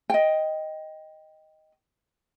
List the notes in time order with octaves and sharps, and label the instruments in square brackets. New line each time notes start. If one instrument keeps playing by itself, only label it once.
[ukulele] D#5 G5